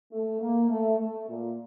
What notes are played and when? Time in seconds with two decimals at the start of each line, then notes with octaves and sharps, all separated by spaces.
0.11 A3
0.40 A#3
0.69 A3
0.99 A3
1.29 A#2